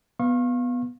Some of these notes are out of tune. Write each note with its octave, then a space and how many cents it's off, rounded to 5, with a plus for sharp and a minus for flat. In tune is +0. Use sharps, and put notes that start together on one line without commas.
B3 +0 F5 +0 C#6 -40